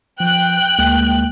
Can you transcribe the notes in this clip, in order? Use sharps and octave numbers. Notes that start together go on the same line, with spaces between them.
F3 G5 F#6
D2 G#3 A#3